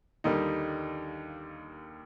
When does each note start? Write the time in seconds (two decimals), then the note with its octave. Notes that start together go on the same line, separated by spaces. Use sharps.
0.24 D#2 D3 G3 A#3 D#4